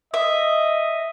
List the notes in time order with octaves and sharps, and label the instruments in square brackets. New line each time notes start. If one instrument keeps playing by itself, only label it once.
[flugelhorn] D#5 [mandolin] E5